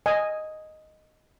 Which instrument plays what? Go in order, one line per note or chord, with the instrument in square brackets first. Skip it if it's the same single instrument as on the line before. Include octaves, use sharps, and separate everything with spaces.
[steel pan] D#5 G#5